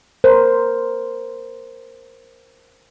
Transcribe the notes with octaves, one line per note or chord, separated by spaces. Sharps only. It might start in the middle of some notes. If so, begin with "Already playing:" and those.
A#4 C5